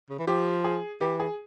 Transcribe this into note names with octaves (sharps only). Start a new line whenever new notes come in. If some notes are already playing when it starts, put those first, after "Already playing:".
C#3
E3
F3 G4
G#4
E3 G4
G#4